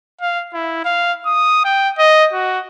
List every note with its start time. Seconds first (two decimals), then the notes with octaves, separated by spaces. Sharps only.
0.21 F5
0.54 E4
0.85 F5
1.25 D#6
1.65 G5
1.98 D#5
2.33 F#4